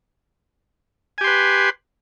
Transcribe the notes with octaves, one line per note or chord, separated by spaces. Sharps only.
G4 B4 G#5 C6